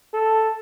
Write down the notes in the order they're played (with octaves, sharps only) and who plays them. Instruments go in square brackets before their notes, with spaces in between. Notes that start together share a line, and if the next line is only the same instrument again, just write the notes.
[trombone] A4